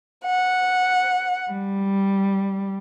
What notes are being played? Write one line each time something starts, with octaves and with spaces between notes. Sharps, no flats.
F#5
G3